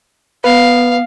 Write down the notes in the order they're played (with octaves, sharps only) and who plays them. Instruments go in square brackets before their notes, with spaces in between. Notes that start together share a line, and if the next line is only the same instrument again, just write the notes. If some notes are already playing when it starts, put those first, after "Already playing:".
[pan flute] B3 [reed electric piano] B4 [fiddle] F5